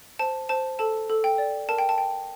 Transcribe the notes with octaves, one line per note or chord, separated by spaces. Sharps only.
C5 A5
C5 A5
A4 A5
A4
G5
D5
A#4 A5
G5
A5
G5